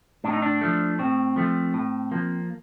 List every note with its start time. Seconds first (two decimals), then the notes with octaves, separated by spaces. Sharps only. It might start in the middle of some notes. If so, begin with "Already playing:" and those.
0.24 A2 D4
0.33 D#4
0.42 D4
0.61 F3 A3
0.99 A2 C4
1.36 F3 A3
1.74 A2
2.11 F3 A#3